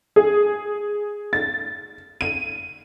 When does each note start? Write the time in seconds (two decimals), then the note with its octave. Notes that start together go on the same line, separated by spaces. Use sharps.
0.16 G#4
1.33 A6
2.21 D#7